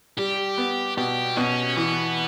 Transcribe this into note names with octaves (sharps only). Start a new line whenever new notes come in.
G3 G4
B3
B2 G4
B2 C#4
E3 B3